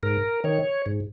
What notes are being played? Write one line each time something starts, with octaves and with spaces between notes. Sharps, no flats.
G#2 A#4
D#3 C#5
G#2